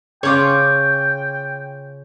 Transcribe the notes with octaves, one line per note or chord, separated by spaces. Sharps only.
C#3 C#4 F4 C#5 G5 D6